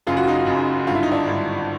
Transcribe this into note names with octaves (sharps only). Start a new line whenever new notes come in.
F#1 F#2 C#3 F4
F#4
D#4 F4
F#1 F#2 C#3
G#1 G2 D3 F4
E4
D#4
D4 E4
G#1 G2 D3